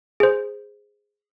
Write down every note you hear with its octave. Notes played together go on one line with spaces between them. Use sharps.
G#4 C5